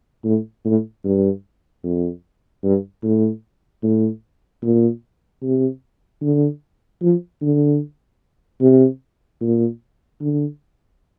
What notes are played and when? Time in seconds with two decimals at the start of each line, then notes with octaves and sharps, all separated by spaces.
0.25 A2
0.65 A2
1.05 G2
1.84 F2
2.64 G2
3.04 A2
3.83 A2
4.63 A#2
5.43 C3
6.22 D3
7.02 F3
7.42 D3
8.61 C3
9.42 A#2
10.21 D3